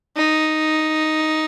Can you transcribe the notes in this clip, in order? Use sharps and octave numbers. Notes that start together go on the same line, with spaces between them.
D#4